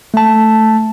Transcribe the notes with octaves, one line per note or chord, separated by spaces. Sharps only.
A3 A5